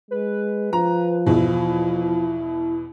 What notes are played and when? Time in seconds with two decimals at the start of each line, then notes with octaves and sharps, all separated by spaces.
0.11 G#3 B4
0.73 F3 A#5
1.26 E2 B2 E4